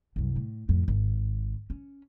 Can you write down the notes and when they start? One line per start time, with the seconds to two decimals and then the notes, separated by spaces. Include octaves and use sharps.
0.16 C2 F#2
0.36 A2
0.69 F2 A2
0.88 G#1
1.70 C#4